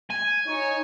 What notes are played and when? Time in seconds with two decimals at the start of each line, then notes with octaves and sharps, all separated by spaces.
0.10 G#5
0.47 D#4 C#5